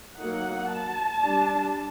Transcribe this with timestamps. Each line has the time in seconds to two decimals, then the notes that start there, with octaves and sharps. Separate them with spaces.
0.17 F#3 A#3 D#4 F#5
0.70 A5
1.23 G3 D4